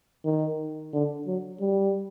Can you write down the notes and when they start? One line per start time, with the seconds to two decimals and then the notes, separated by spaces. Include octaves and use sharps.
0.25 D#3
0.94 D3
1.27 F#3
1.60 G3